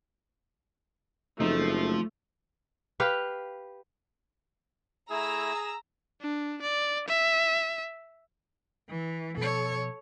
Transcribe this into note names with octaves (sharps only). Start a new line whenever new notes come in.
F#1 F3 A3 C4 D#4
G4 B4 F5
A3 E4 G#4 A#5 E6
D4
D5
E5
E3
B2 F3 A4 C#5